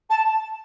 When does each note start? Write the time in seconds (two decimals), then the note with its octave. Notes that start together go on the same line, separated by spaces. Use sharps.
0.10 A5